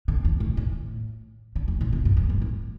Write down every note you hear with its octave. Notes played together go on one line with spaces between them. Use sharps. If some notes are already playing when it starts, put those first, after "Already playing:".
D3
E2
A2
A2
D3
E2
A2
C3
G2
E2
G2
A2